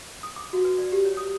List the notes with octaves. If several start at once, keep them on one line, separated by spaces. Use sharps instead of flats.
D#6
D6
F#4
B4
D5
G4
C#5
D#6